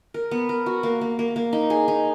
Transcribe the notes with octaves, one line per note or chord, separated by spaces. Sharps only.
A#4
B3
A#4
F#4
A#3
A#3
A#3
A#3
D#4
G#4
D#4